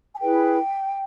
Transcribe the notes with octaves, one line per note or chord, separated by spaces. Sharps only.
G#5
E4 G#4 B4 G5